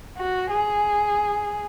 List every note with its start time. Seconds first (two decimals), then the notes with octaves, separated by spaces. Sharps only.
0.17 F#4
0.51 G#4